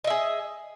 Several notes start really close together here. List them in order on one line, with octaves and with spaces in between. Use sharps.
D#5 E5 G#4